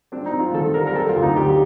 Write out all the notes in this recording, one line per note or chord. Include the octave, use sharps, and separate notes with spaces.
C4 D4
D#4
C4
F4
D#3 A4
G3 A#4
A#4
C4 A4
F4
D2
D#4
D2 G4